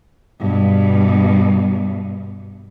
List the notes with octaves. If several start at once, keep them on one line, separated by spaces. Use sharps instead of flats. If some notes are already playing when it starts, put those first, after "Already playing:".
G2 B2